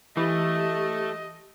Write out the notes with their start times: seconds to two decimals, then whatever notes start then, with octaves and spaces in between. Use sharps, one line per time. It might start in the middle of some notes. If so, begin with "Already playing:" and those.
0.17 E3 A3 G4 D#5